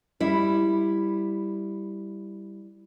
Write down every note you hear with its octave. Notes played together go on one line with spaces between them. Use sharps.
G3 E4